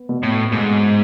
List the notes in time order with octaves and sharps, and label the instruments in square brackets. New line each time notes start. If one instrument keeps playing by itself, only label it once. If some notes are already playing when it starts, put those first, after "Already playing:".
Already playing: [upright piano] B3
B2
[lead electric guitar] A2
[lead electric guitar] G#2 [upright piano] B2